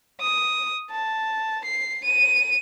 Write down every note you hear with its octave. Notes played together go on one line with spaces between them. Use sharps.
D#6
A5
C7
D#7